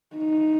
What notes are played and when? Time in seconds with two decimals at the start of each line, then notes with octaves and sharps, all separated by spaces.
0.17 D#4